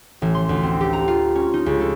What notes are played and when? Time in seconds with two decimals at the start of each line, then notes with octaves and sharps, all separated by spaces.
0.22 A1
0.35 C6
0.49 D2
0.63 C4
0.81 G4
0.93 A#5
1.08 F4
1.35 C#4
1.54 D#4
1.66 C#2
1.81 A4